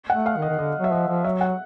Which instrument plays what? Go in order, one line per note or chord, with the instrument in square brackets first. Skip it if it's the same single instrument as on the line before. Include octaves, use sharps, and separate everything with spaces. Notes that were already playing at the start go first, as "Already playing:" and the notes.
[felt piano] F#5
[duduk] A3
[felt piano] F5
[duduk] D#3
[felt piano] D#5
[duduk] D#3
[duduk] D3 [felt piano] D#5
[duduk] F#3 [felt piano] E5
[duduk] F3 [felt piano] D#5
[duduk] F3
[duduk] F#3 [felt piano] E5
[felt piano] F#5